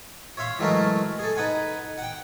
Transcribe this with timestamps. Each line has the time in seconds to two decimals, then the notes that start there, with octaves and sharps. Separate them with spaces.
0.37 C#5 E5 F5 C6
0.59 E3 F#3 G#3 A3 A#4
1.19 G#4 A4
1.36 D#4 B4 F#5 G#5
1.98 F#5 G5